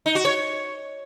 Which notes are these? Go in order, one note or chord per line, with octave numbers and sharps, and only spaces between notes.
D#4
F#4
C#5